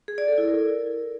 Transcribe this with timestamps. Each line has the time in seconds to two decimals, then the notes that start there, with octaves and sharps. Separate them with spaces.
0.08 G#4
0.18 D5
0.28 A4
0.38 E4
0.48 A#4